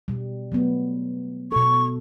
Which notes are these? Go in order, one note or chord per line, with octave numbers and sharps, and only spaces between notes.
B2 G3
F#3 A3 B3
B2 A4 C#6